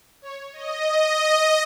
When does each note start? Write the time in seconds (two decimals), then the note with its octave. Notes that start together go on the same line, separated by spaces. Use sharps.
0.22 C#5
0.53 D#5